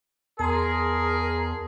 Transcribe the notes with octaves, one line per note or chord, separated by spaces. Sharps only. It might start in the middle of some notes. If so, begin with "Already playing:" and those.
E2 G#4 A#4 A5 A#5 C6